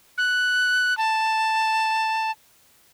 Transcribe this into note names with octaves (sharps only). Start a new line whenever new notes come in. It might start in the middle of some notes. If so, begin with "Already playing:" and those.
F#6
A5